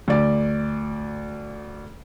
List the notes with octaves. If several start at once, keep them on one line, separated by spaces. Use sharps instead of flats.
D2 D5